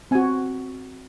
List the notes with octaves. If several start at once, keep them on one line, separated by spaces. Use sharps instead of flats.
C4 F#4 G#5